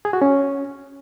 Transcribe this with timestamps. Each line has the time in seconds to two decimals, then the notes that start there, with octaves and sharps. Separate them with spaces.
0.05 G#4
0.13 F#4
0.22 C#4